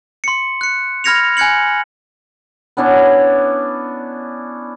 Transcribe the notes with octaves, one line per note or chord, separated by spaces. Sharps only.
C6 C#7
F#6 C#7
B5 F6 G#6 A#6 C#7 F7
G#5 F#6 G#6 C#7 F#7
B3 C#4 D4 E4